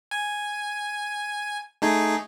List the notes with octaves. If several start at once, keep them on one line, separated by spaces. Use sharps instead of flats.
G#5
A3 D#4 G#4